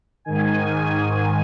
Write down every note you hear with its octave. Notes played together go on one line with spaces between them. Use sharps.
G#2 D#3 G#5